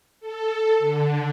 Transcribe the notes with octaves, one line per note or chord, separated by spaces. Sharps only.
A4
D3